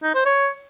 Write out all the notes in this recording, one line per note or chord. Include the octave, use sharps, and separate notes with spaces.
D#4
C5
C#5